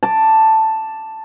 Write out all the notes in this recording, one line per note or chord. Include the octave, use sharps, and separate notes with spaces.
A5 D6